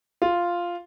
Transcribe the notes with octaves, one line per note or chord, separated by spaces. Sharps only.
F4